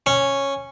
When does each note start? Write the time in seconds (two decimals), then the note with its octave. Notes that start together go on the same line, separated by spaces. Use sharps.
0.06 C#4